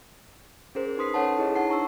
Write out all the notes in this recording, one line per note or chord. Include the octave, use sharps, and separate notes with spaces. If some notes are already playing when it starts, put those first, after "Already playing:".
C#4 G#4 A#4 C5
D#4 B4 C6 D#6 B6 C7
C#4 A4 C#5 F#5 A5
E4 G#4 C#5 D#5
D4 D#4 F#5 A5 C7
A#5 C#6 E6